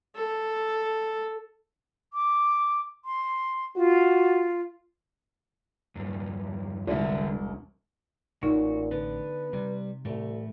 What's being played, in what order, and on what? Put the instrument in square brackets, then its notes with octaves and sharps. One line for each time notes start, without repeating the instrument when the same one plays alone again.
[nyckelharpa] A4
[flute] D6
C6
[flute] F4 [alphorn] F#4
[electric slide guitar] E2 G2
[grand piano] E1 C2 [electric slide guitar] D3 E4
[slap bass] A1 [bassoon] A#2 [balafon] D#4 [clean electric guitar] F#4
[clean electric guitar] D3 B3 D4 [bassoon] B4
[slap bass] C3 [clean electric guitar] G3
[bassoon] C2 [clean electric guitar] A2 E3 A3